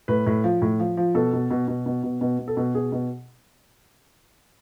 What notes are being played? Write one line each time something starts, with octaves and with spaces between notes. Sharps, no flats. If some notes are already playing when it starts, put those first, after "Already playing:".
A2 B4
A2
F3
A2
F3
F3
B2 A4
B2
B2
B2
B2
B2
B2
B2
A4
B2
B2 G#4
B2